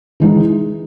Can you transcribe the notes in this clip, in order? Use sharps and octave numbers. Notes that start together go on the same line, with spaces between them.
E3 G#3 D#4